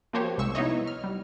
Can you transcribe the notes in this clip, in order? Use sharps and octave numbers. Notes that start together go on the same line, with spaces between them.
F3 A#3 F#4 G4 C5 C#5
C2 G#3 C#6 E6
B3 D#4 E4 C#5 D#5
F6
G3